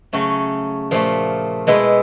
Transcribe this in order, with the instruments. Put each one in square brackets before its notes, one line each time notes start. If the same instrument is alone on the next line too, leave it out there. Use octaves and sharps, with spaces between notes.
[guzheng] C#3 F#3 A3 C#4
A#2 F3 A3
B2 G#3 B3 E4